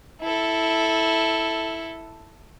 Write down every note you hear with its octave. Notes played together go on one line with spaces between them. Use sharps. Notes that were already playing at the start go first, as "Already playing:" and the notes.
E4 A4